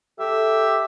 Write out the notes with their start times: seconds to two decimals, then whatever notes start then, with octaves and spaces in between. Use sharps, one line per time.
0.19 G4 A4 E5